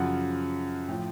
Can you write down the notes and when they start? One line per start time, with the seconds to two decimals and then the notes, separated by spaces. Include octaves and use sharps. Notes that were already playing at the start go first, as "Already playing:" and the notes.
Already playing: F#2 C#3 F3 F#5
0.88 A2 F3 G5